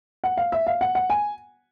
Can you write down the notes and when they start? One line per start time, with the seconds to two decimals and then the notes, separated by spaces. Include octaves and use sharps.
0.24 F#5
0.37 F5
0.52 E5
0.67 F5
0.81 F#5
0.95 F#5
1.10 G#5